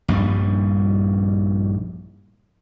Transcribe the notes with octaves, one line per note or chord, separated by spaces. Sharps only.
A#1 G2 G3